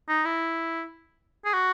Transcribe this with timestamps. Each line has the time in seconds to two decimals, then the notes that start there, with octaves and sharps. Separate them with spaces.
0.09 D#4
0.25 E4
1.45 G#4
1.53 F#4